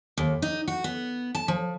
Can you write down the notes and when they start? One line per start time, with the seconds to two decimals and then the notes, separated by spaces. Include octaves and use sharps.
0.18 D#2
0.42 D#4
0.68 F#4
0.84 B3
1.35 A5
1.48 F3